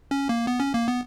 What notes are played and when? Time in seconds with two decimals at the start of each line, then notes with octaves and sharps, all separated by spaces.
0.11 C#4
0.29 A#3
0.47 B3
0.60 C#4
0.74 A#3
0.88 B3